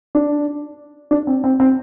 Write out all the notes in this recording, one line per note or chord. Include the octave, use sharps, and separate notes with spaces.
D4
D4
C4
C4
C4